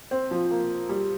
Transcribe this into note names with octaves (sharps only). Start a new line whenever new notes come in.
C4
F3
A#3
G3